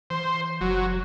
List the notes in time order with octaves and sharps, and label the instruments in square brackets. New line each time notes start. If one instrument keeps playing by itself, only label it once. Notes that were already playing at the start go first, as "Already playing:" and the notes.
[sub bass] E3 [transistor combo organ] C5
[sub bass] F#1 [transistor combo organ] F#3